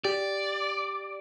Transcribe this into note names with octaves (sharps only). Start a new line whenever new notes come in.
G4 D5